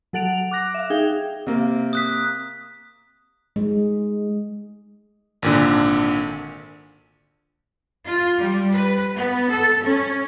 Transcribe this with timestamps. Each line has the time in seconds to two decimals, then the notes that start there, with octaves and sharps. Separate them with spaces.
0.13 F#3 A4 F#5 D7 F7
0.51 D6 F#6 A#6
0.74 E5 F5
0.90 D#4 G#4 G5
1.47 C3 A#3
1.93 D#6 F#6 B6
3.56 G#3
5.42 G#1 A#2 D3
8.06 F4
8.39 G3
8.76 B4
9.18 B3
9.49 A4
9.84 C#4